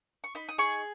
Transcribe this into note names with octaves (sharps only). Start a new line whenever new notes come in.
C#6
D#4 B5
D#6
G#4 C#6